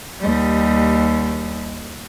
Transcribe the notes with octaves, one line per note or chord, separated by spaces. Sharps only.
D#2 G3